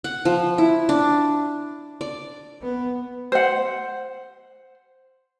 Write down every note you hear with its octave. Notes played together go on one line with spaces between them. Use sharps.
F#5
F3
E4
D4
D5
B3
C5 F#5